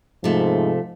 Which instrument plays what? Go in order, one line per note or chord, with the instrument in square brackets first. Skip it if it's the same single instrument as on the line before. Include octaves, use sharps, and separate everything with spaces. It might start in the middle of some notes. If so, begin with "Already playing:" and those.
[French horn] G#2 [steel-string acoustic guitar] C3 A3 [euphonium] F3